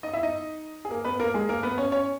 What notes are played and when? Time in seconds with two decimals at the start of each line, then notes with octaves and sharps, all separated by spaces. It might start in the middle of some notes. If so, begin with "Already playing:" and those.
0.03 D#4 D#5
0.13 E4 E5
0.23 D#4 D#5
0.85 G#4
0.91 A#3 A#4
1.05 B3 B4
1.20 A#3 A#4
1.34 G#3 G#4
1.49 A#3 A#4
1.63 B3 B4
1.78 C#4 C#5
1.92 C#4 C#5